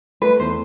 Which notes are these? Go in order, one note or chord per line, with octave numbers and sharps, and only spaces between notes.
A3 B4
E2 C5